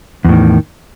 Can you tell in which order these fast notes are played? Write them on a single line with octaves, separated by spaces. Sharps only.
E2 A2 D#3